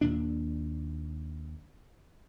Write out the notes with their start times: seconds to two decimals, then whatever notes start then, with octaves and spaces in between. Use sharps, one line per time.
0.01 D#2 A#2 D4